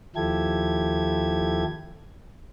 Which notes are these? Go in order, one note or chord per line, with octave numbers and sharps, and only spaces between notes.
D#2 F3 E4 G4 A4 G#6